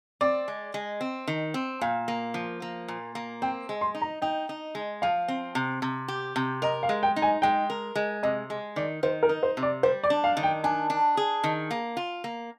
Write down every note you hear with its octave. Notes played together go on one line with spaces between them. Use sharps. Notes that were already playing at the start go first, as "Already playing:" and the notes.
C4 D5
G#3
G#3
C4
D#3
C4
A#2 F5
A#3
F3
A#3
A#2
A#3
C4 G5
G#3
C6
D#4
A#5
D#4 G5
D#4
G#3
F3 F5
C4
C3
C3
G4
C3
A#4 D#5
F5
G#3
G5
D#4
G#5
G#3 G5
A#4
G#3
C3 D#5
G#3
D#3 D5
D#3 C5
A#4
D#4
C5
C3
D5
G3 C5
D5
D4
F5
D#3
G5
D4 G#5
D4
G#4
D#3
A#3
F4
A#3